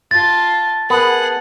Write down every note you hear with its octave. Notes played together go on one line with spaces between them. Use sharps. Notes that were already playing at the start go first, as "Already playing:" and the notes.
F4 A5 A6
B3 G#4 A#4 F#5 A5